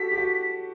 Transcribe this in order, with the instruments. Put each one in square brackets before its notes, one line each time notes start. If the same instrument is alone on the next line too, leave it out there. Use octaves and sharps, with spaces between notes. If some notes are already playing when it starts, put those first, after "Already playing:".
Already playing: [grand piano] F#4 G4 A4 [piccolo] B6
[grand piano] G4
F#4